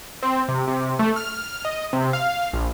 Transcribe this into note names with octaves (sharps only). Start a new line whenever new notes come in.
C4
C3
C3
A3
F6
D#5
C3
F5
A#1